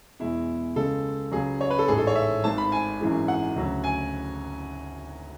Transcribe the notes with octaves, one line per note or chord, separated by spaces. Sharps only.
E2 B2 G#3 E4
C#2 C#3 G#3 A4
C#2 C#3 F#3 G#4
C#5
B4
A4
A1 G#2 G#3 G#4
A4
C#5
E5
G#1 G#2 G#3 A5
B5
G#5
G#1 F#2 E3 G#3
F#5
D2 C#3 F#3
G#5